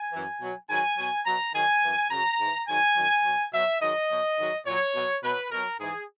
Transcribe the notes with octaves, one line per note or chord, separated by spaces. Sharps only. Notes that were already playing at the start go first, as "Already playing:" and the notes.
Already playing: G#5
F#2 E3
B2 F#3
G#2 D#3 F#3 G#5
B2 F#3
B2 F#3 A#5
G#2 D#3 F#3 G#5
F#2 E3
F#2 C#3 F#3 A#5
G#2 E3
G#2 D#3 F#3 G#5
F#2 D#3 F#3
B2 F#3
B2 F#3 E5
G#2 D#3 F#3 D#5
B2 F#3
G#2 D#3 F#3
A#2 F#3 C#5
B2 F#3
B2 F#3 B4
B2 F#3 A#4
G#2 E3 G#4